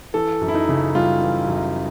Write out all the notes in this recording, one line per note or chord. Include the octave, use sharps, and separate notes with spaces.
E3 A4
F#2
E4
D#4
C#3
G3 F4
E3
F#2